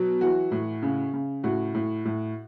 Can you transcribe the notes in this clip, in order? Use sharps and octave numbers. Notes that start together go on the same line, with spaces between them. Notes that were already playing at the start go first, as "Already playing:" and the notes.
Already playing: B2 F#3
E3 F#4
A2
C#3
C#3
A2 F#4
A2
A2